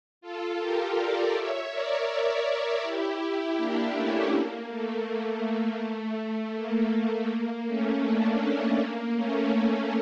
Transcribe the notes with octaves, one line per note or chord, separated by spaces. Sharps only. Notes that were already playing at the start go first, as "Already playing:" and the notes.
F4 A4
G4 A#4
A#4 D5
C#5 E5
A#4 D5
A#4 D5
E4 G4
A#3 D4
A3 C#4
A#3
A3
A#3
A#3
A#3
A3 C#4
A#3 D4
A3 C#4
A#3
A3 C#4
A#3